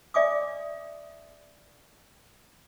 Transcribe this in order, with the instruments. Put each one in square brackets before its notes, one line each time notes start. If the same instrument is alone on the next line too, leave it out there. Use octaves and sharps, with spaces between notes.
[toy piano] D5 E5 G#5 D6 D#6